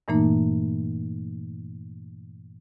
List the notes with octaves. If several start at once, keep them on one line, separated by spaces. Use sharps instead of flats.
G2 A#2 E3 A3 A#3 D#4